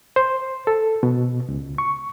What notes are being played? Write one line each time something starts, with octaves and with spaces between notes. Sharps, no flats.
C5
A4
B2
C#2
C#6